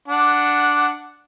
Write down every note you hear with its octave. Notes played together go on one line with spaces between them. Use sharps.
D4 F#5